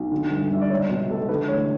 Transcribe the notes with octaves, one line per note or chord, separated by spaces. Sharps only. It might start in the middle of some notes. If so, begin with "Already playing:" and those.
Already playing: B1
D3
G1
G1 E5
D5
C#2 C#5
B2
C#2 A4
D3 B4
A1 C#5